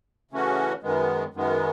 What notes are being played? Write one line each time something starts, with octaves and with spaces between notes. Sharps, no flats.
C#3 E3 A3 C#4 F#4
F#2 D#3 G#3 B3
F#2 D#3 G#3 B3